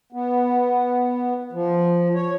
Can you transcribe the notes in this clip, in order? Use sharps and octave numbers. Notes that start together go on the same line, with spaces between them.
B3
F3
C#5